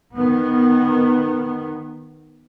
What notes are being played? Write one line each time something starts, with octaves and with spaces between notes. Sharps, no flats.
D#3 B3